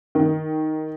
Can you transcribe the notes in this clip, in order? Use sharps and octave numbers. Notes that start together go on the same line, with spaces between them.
D#3